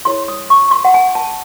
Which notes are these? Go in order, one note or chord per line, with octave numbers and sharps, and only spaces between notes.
E4 G#4 C#5 C6
D#6
C#6
C6
F#5
G#5
A5